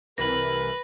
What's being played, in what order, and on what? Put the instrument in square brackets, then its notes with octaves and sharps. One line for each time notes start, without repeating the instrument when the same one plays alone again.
[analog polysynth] C2 C3 E3 [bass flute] A#4 [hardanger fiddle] B4 [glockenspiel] A#6 F#7